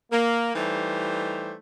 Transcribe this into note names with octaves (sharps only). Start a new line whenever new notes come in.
A#3
E3 G3 A3 D#4 G4 C5